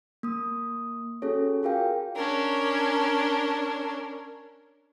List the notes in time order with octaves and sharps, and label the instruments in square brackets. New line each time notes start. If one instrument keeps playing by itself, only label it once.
[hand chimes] A#3 D#6
C#4 F#4 G#4 A4 C#5
F4 F#4 G#4 A#4 F5 G5
[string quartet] C#4 D4 A#4